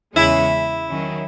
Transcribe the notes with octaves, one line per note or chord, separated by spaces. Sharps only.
E2 C#3 G#3 C#4 E4 G#4
D#3 F#3 C#4